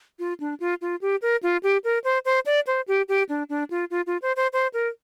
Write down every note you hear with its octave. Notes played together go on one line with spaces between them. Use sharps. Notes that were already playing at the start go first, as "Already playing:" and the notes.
F4
D4
F4
F4
G4
A#4
F4
G4
A#4
C5
C5
D5
C5
G4
G4
D4
D4
F4
F4
F4
C5
C5
C5
A#4